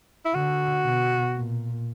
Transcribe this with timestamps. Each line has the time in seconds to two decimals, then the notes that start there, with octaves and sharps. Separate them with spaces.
0.25 E4
0.34 D3 F#4
0.85 B2
1.36 A#2